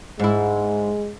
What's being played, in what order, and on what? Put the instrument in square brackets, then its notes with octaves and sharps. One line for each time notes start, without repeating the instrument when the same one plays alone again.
[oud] G#2 E4 [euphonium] G#3